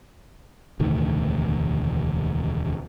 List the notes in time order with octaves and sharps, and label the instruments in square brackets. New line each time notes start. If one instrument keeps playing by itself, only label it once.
[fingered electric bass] E1 D2 A2 D#3